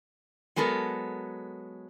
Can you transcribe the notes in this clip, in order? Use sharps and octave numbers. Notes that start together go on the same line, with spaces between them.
F#3 G#3 B3 A4 A#4